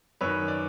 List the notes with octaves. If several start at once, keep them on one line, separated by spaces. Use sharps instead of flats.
F#2 D#3 B4 C#5
D5